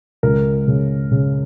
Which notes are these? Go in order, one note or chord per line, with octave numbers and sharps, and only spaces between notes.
C#2 A#4
C#3
C#3